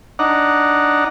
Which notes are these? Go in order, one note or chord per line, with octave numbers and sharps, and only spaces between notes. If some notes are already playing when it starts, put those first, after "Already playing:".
D4 D#4 F#5 A#5